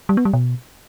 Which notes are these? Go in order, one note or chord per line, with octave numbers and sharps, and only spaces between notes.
G3
B3
G3
B2